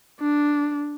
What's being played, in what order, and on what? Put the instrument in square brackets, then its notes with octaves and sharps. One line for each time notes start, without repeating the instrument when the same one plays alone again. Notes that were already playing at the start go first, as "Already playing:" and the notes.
[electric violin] D4